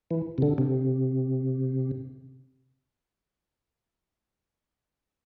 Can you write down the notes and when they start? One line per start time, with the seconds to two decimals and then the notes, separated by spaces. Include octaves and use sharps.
0.11 E3
0.38 C3
0.42 D3
0.58 C3